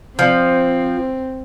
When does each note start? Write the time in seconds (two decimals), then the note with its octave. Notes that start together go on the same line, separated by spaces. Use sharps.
0.19 F3 C4